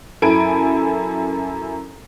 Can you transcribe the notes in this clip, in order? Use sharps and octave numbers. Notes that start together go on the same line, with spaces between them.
F#2 E4 A4 G#5 D7